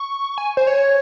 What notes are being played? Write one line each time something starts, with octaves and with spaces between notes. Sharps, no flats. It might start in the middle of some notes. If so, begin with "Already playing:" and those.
Already playing: C#6
G#5
C5
C#5